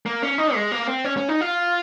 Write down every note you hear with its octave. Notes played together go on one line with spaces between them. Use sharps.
A#3
C#4
D#4
G#3
A#3
C4
C#4
C#4
D#4
F4